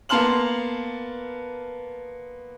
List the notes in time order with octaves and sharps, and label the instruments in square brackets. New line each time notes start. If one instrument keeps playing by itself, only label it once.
[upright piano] A#3 B3 A5 C6 F6 F#7